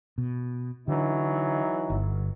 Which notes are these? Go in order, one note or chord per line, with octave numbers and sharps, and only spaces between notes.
B2
D3 E3 F#3 D#4
G1